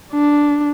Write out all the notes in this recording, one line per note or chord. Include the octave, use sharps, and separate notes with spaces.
D4